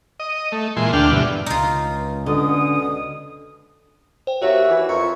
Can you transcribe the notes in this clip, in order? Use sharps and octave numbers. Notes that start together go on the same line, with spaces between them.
D#5
A3
A#2 E3 G#3 C6
D2 D4 G5 F6
G2 B2 D3 E3
C#2 D#4 F4
B2 D3 C#4 D#6
C5 G5
D#2 F#4 A#4 C#5 E5 F#5
E3
F2 A#5 B5 C#6